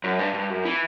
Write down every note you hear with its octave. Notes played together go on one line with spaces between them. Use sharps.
F#2
G2
G2
F#2
E3